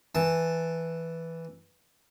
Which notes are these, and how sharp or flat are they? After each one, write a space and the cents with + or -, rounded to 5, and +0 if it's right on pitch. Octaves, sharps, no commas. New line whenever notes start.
E3 +0 A5 +0